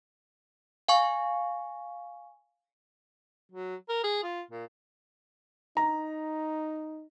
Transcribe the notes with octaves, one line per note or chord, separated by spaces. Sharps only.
F5 G#5 C#6
F#3
A#4
G#4
F4
A#2
D#4 A#5